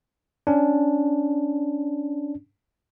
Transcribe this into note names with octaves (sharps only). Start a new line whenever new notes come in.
C#4 D4